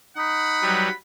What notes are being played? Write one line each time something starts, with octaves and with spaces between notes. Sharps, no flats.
D#4 F#5 B5
F#3 G3 B4